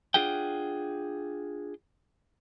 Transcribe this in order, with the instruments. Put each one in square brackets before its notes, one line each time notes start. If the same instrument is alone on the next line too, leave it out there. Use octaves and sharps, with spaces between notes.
[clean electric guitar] D4 F4 G#4 F#5 G5